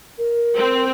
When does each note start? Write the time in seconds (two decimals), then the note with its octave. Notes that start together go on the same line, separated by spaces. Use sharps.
0.18 A#4
0.55 C4